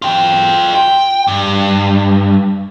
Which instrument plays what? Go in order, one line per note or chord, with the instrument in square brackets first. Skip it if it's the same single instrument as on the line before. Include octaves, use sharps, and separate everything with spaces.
[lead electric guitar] F4 G5
G5
G2